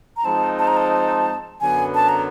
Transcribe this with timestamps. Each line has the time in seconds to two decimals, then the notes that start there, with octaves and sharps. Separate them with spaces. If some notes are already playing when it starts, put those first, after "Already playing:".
0.17 A#5
0.25 F3 G#3 C4 D#4 A5
0.59 A5
0.67 A#5
0.77 A5
1.61 F#2 D3 F#3 B3 G#5
1.95 A5
2.09 A#5